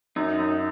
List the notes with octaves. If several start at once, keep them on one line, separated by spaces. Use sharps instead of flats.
F#2 D#4
F#2